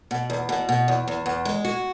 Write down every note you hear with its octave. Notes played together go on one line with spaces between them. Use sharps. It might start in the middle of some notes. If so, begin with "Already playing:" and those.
B2
E2
B2
B2
E2
E2
E2
G#3
F#4